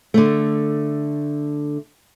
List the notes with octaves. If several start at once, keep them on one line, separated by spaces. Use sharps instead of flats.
D3 A3